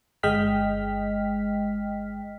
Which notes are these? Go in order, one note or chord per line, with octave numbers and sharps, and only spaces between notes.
G1 G#3 D#5 G5 F6 B6